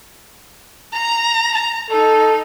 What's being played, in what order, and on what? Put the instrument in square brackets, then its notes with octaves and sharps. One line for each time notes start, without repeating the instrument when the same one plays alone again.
[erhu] A#5
A#5
[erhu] D#4 [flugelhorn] A4